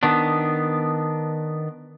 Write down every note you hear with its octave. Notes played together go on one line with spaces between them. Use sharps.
D#3 B3 D4